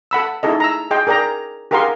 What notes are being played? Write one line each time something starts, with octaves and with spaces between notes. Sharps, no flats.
A4 F#5 B5 E6
D#4 E4 G#4 A4 D#5
A#5 E6
G#4 D#5 G5 C6
G#4 A#4 D5 G5 A#5
G4 G#4 A#4 F5 F#5 C6